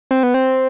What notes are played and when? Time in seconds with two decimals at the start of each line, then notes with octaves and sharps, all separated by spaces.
0.11 C4
0.23 B3
0.34 C4